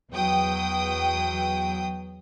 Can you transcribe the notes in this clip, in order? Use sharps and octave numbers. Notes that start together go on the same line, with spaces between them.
E2 F#3 G5 D#6